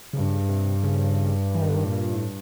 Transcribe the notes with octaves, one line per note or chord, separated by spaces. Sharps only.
G2 C#3
C3
C#3
E3
D#3
D3
D#3
A2
A#2
A2